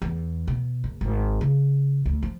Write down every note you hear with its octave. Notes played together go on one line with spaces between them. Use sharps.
E2
B2
F#1
G#1
C#3
D2
F3